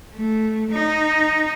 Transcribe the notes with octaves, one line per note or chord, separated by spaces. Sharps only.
A3
D#4